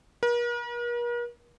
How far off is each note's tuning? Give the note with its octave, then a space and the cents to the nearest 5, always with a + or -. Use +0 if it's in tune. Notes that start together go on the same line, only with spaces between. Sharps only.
A#4 +45